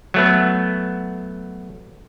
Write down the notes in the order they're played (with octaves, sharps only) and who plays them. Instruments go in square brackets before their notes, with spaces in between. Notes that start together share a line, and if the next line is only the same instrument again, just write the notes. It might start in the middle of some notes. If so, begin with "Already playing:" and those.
[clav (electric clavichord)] F#3 A3 B3